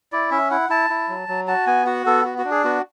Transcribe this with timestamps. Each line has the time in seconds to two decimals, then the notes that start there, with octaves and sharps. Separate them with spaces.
0.12 E4 D5
0.31 C#4 E5
0.51 E4 F#5
0.69 E4 A5
0.90 E4
1.09 F#3
1.28 F#3
1.48 F#4 A5
1.67 B3 G#5
1.86 F#4 F#5
2.06 B3 A4
2.25 F#4
2.38 F#4
2.45 D4
2.51 G#4
2.64 B3 F#4